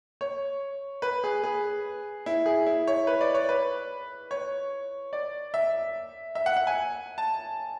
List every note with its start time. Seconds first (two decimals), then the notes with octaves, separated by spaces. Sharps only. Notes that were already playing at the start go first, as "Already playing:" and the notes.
0.21 C#5
1.02 B4
1.24 G#4
1.44 G#4
2.26 E4
2.46 G#4
2.67 E4
2.87 C#5
3.07 B4
3.21 D5
3.34 C#5
3.49 B4
4.31 C#5
5.13 D5
5.54 E5
6.35 E5
6.46 F#5
6.56 F#5
6.67 G#5
7.18 A5